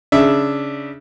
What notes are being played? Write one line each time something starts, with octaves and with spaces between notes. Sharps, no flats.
C#3 D4 E5